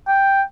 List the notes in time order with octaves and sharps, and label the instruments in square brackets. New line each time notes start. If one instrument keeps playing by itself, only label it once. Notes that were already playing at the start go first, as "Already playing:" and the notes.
[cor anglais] G5